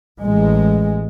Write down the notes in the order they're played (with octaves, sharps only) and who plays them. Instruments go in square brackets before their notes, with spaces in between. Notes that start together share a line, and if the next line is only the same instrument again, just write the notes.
[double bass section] A1 G#3